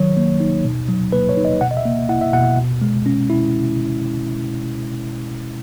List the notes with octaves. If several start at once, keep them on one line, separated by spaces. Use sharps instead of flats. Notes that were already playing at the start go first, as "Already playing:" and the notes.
Already playing: D#3 F#3 C#5
A#3
D#4
B2
F#3
A#3 B4
C#5
D#4
D#5
B2 F#5
D#5
E5
A#3
E4 F#5
E5
B2 F#5
B2
G#3
C#4
E4